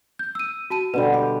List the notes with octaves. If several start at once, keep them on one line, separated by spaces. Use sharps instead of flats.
G6
E6 D#7
F#4 A5 D#7
B2 D3 G3 B4
G4